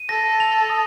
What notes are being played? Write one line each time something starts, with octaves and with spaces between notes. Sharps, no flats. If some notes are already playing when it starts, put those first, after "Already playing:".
Already playing: D#7
A4 A#6
F7
D#6